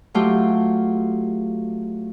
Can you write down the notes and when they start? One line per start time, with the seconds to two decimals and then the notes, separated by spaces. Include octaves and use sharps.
0.14 F#3 A3 F4 G4